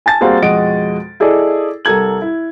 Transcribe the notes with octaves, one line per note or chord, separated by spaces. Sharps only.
G#5 A5 A6
G3 A#3 C4 F#4 G#4
F2 B2 G#3 F#4 D#5 D7
E4 G#4 A4 D5 D#5
C2 A4 A#4 G#6 F#7
E4